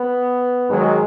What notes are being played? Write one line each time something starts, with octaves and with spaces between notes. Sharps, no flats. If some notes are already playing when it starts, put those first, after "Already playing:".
Already playing: B3
G#2 D#3 F#3 G#3